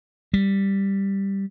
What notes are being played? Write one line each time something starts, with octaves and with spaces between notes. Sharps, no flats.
G3